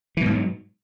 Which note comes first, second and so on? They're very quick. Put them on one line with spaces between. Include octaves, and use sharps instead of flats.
E3 B2 G#2 F#3